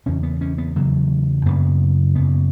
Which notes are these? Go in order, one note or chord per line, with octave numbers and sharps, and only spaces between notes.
E2 C#3 C#4
B3
C#4
B3
E2 C#3 F#3
F#2 C#3 B3
F#2 C#3 B3